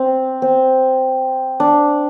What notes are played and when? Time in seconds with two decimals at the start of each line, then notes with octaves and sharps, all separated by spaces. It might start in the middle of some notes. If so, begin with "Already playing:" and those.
Already playing: C4
0.42 C4
1.60 D4